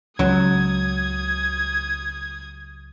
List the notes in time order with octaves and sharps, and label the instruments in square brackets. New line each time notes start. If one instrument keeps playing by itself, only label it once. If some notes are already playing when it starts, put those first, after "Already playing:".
[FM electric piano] C#2 [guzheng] F#3 [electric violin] D#6 G#6